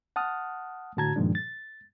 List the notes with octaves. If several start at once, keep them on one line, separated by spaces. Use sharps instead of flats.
F#5 A5 D#6 F6
A2 D3 F#4 A5 A#5 G#6
G2 A#2 D#3 F3 G#3 D4
A6